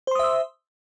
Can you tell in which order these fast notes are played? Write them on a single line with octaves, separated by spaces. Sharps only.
C5 C6 D#6 E5 E6